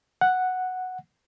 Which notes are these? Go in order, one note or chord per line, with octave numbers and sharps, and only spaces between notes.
F#5